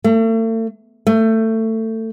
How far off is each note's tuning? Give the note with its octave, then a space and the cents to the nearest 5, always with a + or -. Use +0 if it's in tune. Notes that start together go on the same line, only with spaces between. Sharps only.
A3 +40
A3 +20